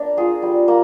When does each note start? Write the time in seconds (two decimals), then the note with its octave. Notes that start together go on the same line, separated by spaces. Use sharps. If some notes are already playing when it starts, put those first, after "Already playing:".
Already playing: A#3 D4 A#4
0.17 F4 G#4
0.42 G3
0.68 A#3